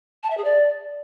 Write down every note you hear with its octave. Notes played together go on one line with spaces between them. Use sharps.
A5
E5
G#4
D5